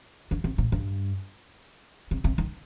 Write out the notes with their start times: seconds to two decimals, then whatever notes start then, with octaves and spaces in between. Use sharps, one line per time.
0.31 D3
0.44 C3
0.58 A#2
0.72 G2
2.11 C3
2.24 C3
2.38 D#3